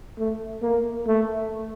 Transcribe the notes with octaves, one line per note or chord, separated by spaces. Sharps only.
A3
A#3
A3